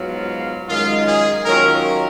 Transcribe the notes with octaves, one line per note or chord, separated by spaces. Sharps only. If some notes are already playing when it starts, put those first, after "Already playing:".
Already playing: G#2 F#3 B3 F4
F#2 D#3 G#3 D#4 F4
G#4
D#3 F#3 C#4 F4 A#4